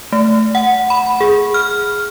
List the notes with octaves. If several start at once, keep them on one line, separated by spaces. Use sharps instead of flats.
A3
F#5
B5
G#4
F6